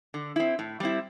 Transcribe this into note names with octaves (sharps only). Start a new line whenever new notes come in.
D3
C4 E4
A2
G3 C4 E4